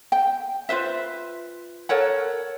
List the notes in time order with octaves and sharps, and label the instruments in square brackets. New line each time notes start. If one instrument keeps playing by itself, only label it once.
[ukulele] G5
F4 B4 C5 E5
A4 A#4 C#5 F#5